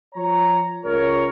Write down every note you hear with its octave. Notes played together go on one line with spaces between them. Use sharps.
F3 C#5 A#5
C#2 A#4 C#5